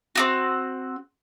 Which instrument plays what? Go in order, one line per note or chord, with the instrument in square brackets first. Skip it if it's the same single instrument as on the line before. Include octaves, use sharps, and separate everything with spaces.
[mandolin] C4 D#4 F#4